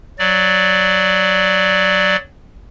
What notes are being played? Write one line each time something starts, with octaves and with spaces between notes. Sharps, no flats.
F#3 D5